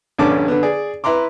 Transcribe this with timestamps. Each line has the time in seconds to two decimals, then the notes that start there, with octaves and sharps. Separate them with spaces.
0.19 A#1 G2 D3 C#4 A5 D6
0.48 D3 B3
0.63 G#4 D5
1.04 E4 B4 A#5 C6 D6